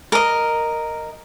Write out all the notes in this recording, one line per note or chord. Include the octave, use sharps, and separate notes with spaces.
A#4 D#5